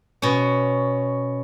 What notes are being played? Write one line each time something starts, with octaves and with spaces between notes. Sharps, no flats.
B2 C#4